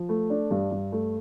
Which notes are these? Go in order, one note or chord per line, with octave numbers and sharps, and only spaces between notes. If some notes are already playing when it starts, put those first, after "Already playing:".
Already playing: F3
A3
D4
G2
G2
A3